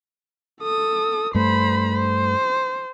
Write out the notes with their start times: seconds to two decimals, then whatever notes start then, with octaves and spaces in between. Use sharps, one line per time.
0.62 A4 D#6
1.35 G2 A3 C5 B5
1.95 C5